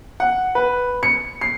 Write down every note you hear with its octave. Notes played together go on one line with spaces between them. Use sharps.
F#5
B4
C#7
C7